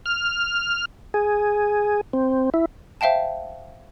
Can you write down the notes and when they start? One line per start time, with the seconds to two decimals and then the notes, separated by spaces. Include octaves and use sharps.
0.06 F6
1.14 G#4
2.13 C4
2.54 E4
3.01 C5 E5 F5 G5 A5